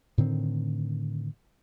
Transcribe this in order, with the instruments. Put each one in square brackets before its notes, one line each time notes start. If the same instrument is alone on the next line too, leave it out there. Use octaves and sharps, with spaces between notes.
[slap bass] A2 D3 D#3 C4